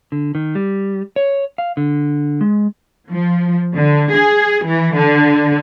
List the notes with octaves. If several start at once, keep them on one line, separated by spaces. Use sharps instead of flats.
D3
D#3
G3
C#5
F5
D3
G#3
F3
D3
G#4
E3
D3